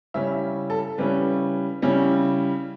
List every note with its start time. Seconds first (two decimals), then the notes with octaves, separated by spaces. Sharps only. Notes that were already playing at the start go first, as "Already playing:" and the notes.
0.14 C#3 G3 C#4 E4 E5
0.70 A4
0.98 C#3 G3 C#4 E4 B4
1.82 C#3 G3 C#4 E4